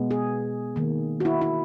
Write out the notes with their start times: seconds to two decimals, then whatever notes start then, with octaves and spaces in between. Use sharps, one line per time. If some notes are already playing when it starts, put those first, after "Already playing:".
Already playing: B2 G#3 B3
0.11 G#4
0.76 D#3 A#3
1.20 F#4
1.25 E4
1.41 E4